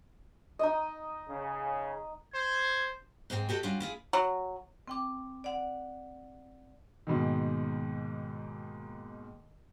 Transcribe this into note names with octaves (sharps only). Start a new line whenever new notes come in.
D#4 D#5
C#3
C5 G#6
G#2 G#3 C4 A#4 G5
F#4 G4 A4 C#5 D#5
G3 C#4 D4 F4 F#4
E4 F4 G#4
F#3
C4 G5 D6
D5 F#5
D#2 G#2 B2 D#3